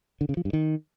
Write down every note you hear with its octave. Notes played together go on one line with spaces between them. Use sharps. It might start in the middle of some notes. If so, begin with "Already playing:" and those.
D3
C#3
F3
G2
D#3